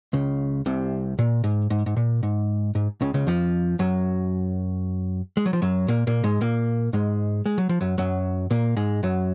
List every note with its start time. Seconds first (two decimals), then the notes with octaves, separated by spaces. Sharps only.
0.13 C#2 C#3
0.66 C2 C3
1.19 A#2
1.44 G#2
1.70 G#2
1.86 G#2
1.97 A#2
2.23 G#2
2.75 G#2
3.01 C#2 C#3
3.14 C#2 C#3
3.27 F2 F3
3.79 F#2 F#3
5.37 G#3
5.46 F#3
5.53 F3
5.62 F#2 F#3
5.88 A#2 A#3
6.07 A#2 A#3
6.24 G#2 G#3
6.41 A#2 A#3
6.93 G#2 G#3
7.46 G#3
7.58 F#3
7.69 F3
7.81 F#2 F#3
7.98 F#2 F#3
8.51 A#2 A#3
8.77 G#2 G#3
9.03 F#2 F#3